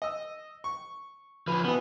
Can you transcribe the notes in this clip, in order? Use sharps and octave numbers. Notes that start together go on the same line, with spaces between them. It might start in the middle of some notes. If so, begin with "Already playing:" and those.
D#5 E6
C#6
F3 B4
B2 E3 B3